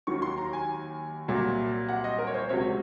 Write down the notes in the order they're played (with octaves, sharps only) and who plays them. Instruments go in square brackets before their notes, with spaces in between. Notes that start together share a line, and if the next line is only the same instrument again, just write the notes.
[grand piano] D#2 D#3 F#3 C#6
C6
A#5
G#5
C2 A#2 F#3
F#5
D#5
A#4
C#5
C5
C#2 C3 F#3 C#5